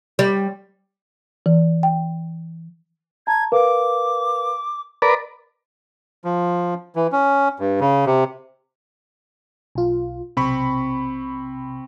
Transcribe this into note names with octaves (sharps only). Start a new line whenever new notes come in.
G3
E3
G5
A5 A#5 G#6
A#4 B4 F5 D6
A#4 B4 D5 A6
F3
E3
C#4
G2
C#3
C3
B1 F4
B1 C3 C4 B5 C#6